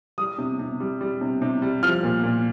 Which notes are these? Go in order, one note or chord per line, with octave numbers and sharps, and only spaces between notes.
G3 D#6
C3
C3
G3
G3
C3
C3
G3
F3 F6
A#2
A#2